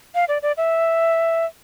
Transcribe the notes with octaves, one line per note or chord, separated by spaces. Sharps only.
F5
D5
D5
E5